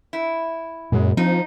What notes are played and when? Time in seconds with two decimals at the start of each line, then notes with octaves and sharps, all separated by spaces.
0.13 E4
0.92 F#2 A#2 G#3
1.17 F3 C4 D#4